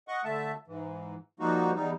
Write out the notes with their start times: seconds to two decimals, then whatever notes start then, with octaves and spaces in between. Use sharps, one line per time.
0.08 D#5 F#5 C#6
0.25 D3 A3 E5 A5
0.67 G#2 E3
1.40 F3 G3 A#3 D#4 F#4
1.75 E2 G3 D#4